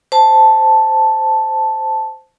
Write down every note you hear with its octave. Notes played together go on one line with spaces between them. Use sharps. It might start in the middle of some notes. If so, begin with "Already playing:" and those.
C5 A5